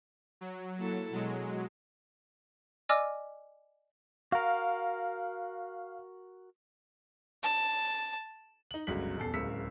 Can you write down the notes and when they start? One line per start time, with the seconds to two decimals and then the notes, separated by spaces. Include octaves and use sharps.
0.41 F#3
0.77 A#3 E4 A4
1.13 B2 F#3 G#3
2.89 D5 D#5 G#5 D6 E6 F6
4.32 F#4 A#4 F5
7.43 A5
8.71 D#4 F#7
8.87 G1 C#2 F#3 B6 F#7
9.17 D#1 E2 A4 C7
9.33 D1 C#2 A#4 E6 B6 C#7